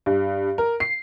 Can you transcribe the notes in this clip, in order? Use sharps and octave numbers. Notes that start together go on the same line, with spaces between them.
G2
A#4
C7